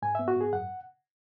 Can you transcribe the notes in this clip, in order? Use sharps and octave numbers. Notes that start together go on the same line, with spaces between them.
G#2 G#5
B3 E5
F#4
G#2 G#4
F#2 F#5